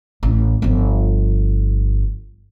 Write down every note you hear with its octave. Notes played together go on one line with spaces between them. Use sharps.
A1
G1 F3